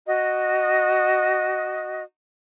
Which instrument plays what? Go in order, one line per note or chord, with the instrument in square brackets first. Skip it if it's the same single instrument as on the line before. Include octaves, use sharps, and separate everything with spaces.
[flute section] F#4 D#5